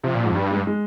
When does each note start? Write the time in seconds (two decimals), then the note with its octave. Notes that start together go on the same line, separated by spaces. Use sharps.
0.03 C3 F3
0.14 A#2
0.20 F3
0.25 G#2
0.31 F2
0.35 G2 G3
0.51 G#3
0.67 G#3